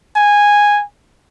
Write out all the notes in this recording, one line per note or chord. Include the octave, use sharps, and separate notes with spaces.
G#5